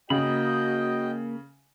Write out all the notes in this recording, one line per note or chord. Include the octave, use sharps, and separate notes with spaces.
C#3 A#3 F#4 D#5 G5 B5